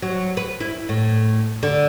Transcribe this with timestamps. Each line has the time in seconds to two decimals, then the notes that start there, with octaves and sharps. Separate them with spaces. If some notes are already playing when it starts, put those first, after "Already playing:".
0.02 F#3
0.37 B4
0.60 E4
0.89 A2
1.63 D3